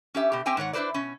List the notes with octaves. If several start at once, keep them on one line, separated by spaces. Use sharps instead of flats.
C#4 G4 E5
B2 G4
C4 G4 C5 G5 G#5
G#2 D#3 C#5 F#5
D4 E4 A4 B4 C5 D5
B2 C#4